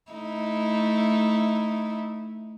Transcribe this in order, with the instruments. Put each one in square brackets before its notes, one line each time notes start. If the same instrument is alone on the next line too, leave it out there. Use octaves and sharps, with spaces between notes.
[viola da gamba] A3 D#4 E4